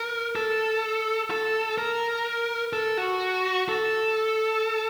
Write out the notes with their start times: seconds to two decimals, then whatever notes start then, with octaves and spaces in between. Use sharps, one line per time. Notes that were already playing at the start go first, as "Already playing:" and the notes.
Already playing: A#4
0.36 A4
1.31 A4
1.78 A#4
2.73 A4
2.97 F#4
3.69 A4